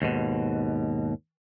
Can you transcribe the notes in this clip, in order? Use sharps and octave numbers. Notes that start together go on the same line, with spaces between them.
D#2 G#2 B2